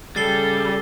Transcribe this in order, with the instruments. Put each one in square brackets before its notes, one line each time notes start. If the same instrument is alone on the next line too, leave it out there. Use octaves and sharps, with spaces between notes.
[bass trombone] C#3 [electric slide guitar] G3 [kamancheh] G4 A4 [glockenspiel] A6 C7 G7